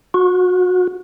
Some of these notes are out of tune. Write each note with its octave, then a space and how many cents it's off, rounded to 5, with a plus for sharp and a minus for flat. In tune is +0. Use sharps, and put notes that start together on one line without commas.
F#4 -30